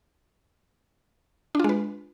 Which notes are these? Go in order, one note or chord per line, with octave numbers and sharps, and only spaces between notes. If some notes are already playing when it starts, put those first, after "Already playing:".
G#3 D4 F4 B4